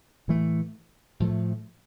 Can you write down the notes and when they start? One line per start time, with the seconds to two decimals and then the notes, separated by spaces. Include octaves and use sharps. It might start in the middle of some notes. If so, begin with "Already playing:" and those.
0.28 A2 E3 A3
1.20 A2 F3 A3